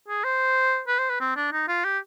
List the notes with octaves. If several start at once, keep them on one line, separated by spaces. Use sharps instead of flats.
G#4
C5
B4
C5
B4
C4
D4
D#4
F4
G4